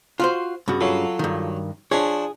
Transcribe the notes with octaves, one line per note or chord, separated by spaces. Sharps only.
F4 F#4 C5
G2 C#3 F#4
F#3 F4 A4
G2 D#3
F3 D4 G#4 C#5